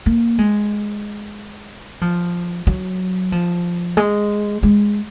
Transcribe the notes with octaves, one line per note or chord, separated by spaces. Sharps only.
A#3
G#3
F3
F#3
F3
G#3
G#3